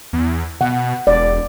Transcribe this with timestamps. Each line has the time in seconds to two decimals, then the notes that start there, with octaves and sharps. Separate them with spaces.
0.13 E2
0.61 B2 F#5
1.07 E1 D5